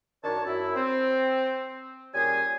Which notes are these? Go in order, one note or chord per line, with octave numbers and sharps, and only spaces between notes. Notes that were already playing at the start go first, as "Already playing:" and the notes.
F#2 D#3 D4 C#5 A5
F#2 E4
C4
A#2 G3 C#4 G#4 G#5